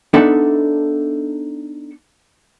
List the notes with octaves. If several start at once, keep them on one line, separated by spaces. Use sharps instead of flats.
B3 D4 D#4 A4 E5 F#5